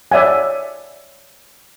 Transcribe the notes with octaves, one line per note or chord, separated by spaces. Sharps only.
C#5 D5 E5 F#5 G#5